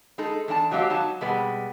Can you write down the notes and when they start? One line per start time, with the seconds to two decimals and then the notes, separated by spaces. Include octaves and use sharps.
0.18 G#3 D#4 A4
0.48 E2 D4 E4 A5
0.71 F#3 G#3 C4 G4 F5
0.90 F#3 D#4 A5
1.21 B2 G3 G#3 B3 C4